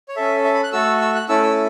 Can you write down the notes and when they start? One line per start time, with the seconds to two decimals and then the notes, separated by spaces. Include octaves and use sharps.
0.09 C#5
0.16 C#4 A4 E5
0.44 E5
0.54 B5
0.63 F#6
0.72 A3 F#4 A4 E6
1.01 E6
1.15 F#6
1.29 A3 C#4 E4 A4 E6
1.43 E6